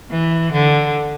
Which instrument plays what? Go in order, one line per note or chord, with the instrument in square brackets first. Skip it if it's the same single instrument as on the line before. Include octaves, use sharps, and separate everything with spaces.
[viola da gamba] E3
D3